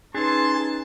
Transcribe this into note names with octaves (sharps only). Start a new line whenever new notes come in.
C#4 D#4 G#4 B4 A5 C6